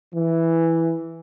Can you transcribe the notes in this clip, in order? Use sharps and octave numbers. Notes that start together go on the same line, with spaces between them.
E3